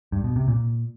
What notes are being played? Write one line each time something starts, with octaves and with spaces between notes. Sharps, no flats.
G2
B2
C3
A#2